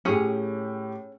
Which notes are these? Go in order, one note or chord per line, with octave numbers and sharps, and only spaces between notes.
A2 C#4 G4 G#4